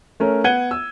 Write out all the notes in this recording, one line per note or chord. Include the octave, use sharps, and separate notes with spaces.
A3 C#4 A#4
B3 F#5 G#6 D#7 G7
E6